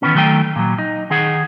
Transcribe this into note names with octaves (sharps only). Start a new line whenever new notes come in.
D#3 E3 B3 C#4
D#3 F#3 A3 C5 G5
A#2 F#3
D#4
D#3 D#4 G#4 F#5